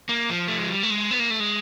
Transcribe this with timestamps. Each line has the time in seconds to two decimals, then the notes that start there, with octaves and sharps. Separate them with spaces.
0.09 A#3
0.30 F3
0.48 A3
0.59 G#3
0.69 G3
0.83 A3
0.91 G#3
1.11 B3
1.20 A#3
1.31 A3
1.40 G#3